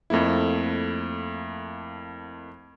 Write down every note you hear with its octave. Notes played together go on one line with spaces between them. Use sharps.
F2 A3 A#3 E4